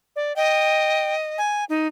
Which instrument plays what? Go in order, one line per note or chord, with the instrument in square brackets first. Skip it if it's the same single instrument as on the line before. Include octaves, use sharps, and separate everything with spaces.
[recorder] D5
[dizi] D#5 [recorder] G5
[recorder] G#5
D#4